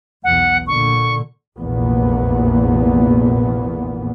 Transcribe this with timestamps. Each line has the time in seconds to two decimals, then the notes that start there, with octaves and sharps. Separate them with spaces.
0.24 B1 E2 F#5
0.67 A#2 D3 C#6
1.57 F1 A#1 E2 A#2 B3